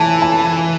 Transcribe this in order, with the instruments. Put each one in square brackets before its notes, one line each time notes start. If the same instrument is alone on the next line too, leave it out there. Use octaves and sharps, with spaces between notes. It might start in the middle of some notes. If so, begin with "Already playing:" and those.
Already playing: [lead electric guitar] E3 [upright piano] G#5 A5
[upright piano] A5